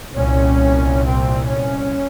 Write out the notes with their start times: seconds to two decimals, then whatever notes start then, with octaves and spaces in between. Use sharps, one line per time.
0.16 C2 A#2 C#4
1.05 C4
1.47 C#4